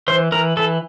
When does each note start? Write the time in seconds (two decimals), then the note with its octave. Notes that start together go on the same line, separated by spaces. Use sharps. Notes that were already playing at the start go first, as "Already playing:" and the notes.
0.08 E3 C5
0.32 E3 A#4
0.57 E3 A4